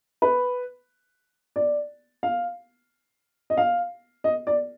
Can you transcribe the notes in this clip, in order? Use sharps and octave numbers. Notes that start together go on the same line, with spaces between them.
B4
D5
F5
D#5
F5
D#5
D5